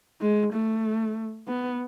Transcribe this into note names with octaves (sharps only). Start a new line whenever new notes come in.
G#3
A3
B3